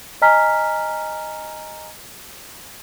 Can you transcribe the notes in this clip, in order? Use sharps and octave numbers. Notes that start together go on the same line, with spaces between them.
D#5 G#5 A#5 F6 B6